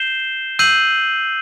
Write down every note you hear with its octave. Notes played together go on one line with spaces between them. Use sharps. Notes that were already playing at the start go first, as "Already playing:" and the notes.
Already playing: G6 C7 E7 G7
E6 G6 C7 D#7 F#7